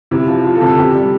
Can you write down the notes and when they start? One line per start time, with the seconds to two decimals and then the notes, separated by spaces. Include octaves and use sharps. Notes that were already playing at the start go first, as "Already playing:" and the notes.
0.11 C3 E4
0.28 F3
0.44 F3 F4
0.55 A4
0.61 C3
0.67 A4
0.77 C3 G4
0.94 G3